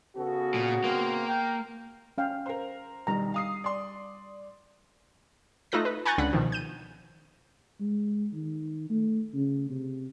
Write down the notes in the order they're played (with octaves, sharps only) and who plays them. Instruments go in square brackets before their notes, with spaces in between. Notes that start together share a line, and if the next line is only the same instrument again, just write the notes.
[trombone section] C#3 B3 F#4 [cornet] A4
[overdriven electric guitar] A#2
[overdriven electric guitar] A#3 [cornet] C4
[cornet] G5
[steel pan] C#4 F5 G5
[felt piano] A#4 C5
[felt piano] B1 D#3 [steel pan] G3 A#5
[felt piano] F5 D#6 C7
D5 C6
[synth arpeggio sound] A3 D#4 F4 A4 F#6 A#6
B4
G#5 A#5 C#6 F#6 G6 A6
C#2 D3 F#5 B5
B2 D#3 F3
G6 D#7
[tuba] G#3
D#3
A3
C#3
C3